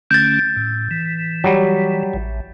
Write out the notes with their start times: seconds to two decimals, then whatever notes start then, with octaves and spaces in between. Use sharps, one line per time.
0.11 D3 A3 C#4 G6 A6
0.56 A2
0.91 E3
1.44 F#3 G3
2.14 A1